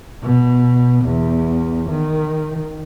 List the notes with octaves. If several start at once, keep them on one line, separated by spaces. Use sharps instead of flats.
B2
E2
D#3